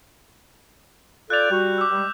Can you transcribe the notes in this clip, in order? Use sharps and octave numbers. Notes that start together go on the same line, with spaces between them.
F4 A4 D5 F#6 G6 F7
G3 F#4
D6 E6
G3 G#3